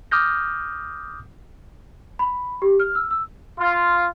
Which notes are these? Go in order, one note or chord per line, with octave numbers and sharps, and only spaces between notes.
D6 D#6 F6 G6 A#6
B5
G4
F6
E6
E6
F4